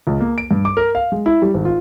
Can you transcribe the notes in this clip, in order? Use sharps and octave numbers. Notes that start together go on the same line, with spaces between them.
C#2
A#3
D7
G2
D6
A#4
F5
G#3
E4
G3
G#1
F4